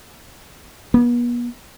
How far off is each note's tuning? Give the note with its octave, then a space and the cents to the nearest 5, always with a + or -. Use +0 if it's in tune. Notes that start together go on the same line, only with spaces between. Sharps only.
B3 -40